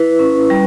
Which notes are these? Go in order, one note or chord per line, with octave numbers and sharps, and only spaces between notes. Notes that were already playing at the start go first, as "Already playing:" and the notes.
Already playing: E4 B4
C#4
G3